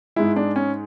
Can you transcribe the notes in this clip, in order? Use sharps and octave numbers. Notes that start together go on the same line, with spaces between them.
G#2 G#3 E4
D4
C#4